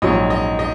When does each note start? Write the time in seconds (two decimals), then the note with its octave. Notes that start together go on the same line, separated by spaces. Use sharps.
0.02 A#1 G#2 F#3 C#4 D#5
0.30 D#5
0.59 D#5